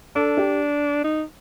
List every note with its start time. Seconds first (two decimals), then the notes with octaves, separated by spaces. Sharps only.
0.15 D4 A4
0.37 G4
1.04 D#4